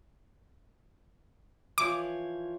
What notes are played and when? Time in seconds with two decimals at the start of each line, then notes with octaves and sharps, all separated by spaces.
1.78 E3 F3 C#5 D6